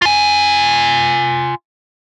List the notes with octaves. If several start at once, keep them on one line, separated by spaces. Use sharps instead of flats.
F4 G#5